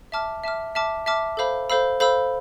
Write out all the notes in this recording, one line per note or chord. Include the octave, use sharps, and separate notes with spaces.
E5 A5 D6 F6
E5 A5 D6 F6
E5 A5 D6 F6
E5 A5 D6 F6
A4 C5 F5 B5 E6
A4 C5 F5 B5 E6
A4 C5 F5 B5 E6